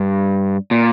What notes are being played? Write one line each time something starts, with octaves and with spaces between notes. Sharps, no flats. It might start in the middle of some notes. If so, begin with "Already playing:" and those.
Already playing: G2
A#2